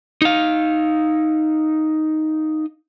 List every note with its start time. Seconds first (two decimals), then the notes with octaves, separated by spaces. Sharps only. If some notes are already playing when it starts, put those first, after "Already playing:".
0.22 D#4 F5